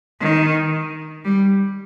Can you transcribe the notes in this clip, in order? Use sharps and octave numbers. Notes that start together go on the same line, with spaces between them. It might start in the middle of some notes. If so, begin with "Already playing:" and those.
D#3
G3